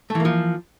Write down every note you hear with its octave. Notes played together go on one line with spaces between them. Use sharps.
E3 F3 A3 A#3